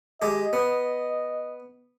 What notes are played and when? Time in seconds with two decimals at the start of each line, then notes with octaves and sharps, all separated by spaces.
0.22 G#3 G4 D#5
0.53 B3